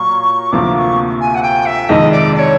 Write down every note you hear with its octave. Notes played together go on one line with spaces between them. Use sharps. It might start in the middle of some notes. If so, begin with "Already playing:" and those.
Already playing: A#2 F#3 A#3 C#6
D2 C3 F3 A#3 D6
D6
C#6
G#5
F#5
G5
E5
F2 C3 D#3 G#3 D#5
D5
D5
C#5